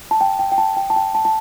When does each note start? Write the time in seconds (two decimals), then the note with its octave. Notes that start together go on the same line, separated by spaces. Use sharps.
0.11 A5
0.21 G5
0.39 G5
0.52 G5
0.58 A5
0.77 G5
0.90 A5
0.96 G5
1.15 A5
1.25 A5